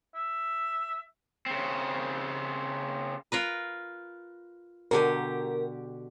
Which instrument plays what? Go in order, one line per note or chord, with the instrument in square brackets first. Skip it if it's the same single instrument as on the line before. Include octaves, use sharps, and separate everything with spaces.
[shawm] E5
[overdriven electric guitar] C#3 C4
[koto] F4 A#4 B4
[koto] B2 D3 G4 [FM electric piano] A#4